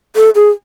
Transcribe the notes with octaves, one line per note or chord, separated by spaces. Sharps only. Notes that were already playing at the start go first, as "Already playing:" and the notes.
A4
G#4